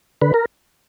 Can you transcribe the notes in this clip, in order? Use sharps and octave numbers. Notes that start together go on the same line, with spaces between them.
D3 B4
A#4